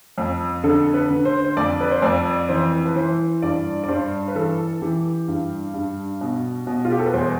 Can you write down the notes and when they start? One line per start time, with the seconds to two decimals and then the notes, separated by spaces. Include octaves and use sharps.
0.18 F2
0.64 D3 A4
0.94 B4
1.11 D3
1.25 C5
1.45 C5
1.57 F2 D5
1.81 B4
1.91 C5
2.02 F2 D5
2.49 E3 C5
2.85 B4
2.96 E3 C5
3.42 G2 D5
3.84 D5
3.88 G2 C5
4.28 B4
4.35 E3 A4
4.82 E3 G4
5.28 G2
5.74 G2
6.21 B2
6.67 B2
6.85 F4
6.92 G4
6.99 A4
7.06 B4
7.13 E2 C5